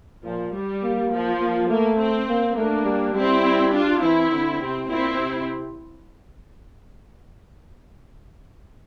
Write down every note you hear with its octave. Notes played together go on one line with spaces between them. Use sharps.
A#2 F3
G3
A#3
F3
A#3
A3 A#3
C4
A#3
A3 A#3 D4
G3
G3 C4 E4
D4 F4
E3 C4 E4
D3
C3 C4
A#2 C4 E4
C3